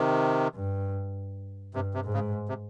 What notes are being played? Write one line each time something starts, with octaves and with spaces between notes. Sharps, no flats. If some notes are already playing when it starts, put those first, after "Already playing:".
Already playing: C3 D#3
G2
G2 C3
C3
G#2
C#3
C3